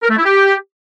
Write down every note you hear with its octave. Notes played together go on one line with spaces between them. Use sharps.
A#4
A3
E4
G4